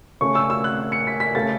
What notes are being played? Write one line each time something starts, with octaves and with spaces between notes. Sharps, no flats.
C#3 A3 C#4 C#6
E6
E6
F#6
C#7
B6
B6
C#3 A3 A6